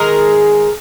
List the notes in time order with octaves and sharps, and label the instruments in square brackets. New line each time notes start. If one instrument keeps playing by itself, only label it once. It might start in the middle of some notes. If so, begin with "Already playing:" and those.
Already playing: [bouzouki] D#3 G#3 G#4 A#4